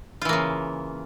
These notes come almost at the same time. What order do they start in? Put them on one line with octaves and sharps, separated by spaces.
F4 E3 A#3 C#3